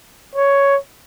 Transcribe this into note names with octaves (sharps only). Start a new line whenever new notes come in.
C#5